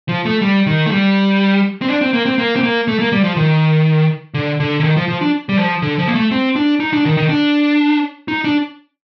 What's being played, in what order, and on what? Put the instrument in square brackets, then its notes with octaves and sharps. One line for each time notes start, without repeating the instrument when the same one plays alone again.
[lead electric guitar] F3
A3
G3
D#3
A3
G3
C4
D4
C4
A#3
C4
A#3
C4
A#3
A3
A#3
G3
F3
D#3
D3
D3
D3
D#3
F3
F3
D4
G3
F3
D3
F3
A#3
A3
C4
D4
D#4
D4
D#3
D#3
D4
D#4
D4